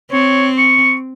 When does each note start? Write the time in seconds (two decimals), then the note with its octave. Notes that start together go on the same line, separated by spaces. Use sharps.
0.12 C4 C#5
0.58 C#6